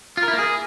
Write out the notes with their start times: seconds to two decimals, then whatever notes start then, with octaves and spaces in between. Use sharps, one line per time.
0.17 F4
0.23 A#4
0.28 E4
0.33 A#3
0.39 G#4